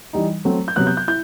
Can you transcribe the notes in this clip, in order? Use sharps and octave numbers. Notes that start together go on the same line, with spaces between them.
E3 G3 D#4
F#3 A3 C4
G6
C3 F#3 B3 F#6
G6
G6
E4 G6